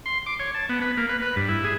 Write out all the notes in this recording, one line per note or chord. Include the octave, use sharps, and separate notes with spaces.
C6
D6
C#5
A5
B3
B4
A#3
B4
B4
G2
E4
G#4